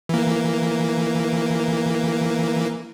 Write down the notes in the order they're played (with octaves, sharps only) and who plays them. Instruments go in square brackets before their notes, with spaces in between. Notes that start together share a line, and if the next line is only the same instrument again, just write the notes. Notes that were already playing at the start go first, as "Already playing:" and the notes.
[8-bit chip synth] E3 A#3